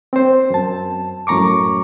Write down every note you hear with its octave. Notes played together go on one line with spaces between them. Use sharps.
C4 C5
F#2 A5
F#2 A2 A#5 C#6 D6